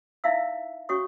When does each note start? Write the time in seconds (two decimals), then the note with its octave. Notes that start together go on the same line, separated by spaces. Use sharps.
0.24 D#4 E4 E5 F5 E6
0.89 C#4 F#4 C#5 C#6 D#6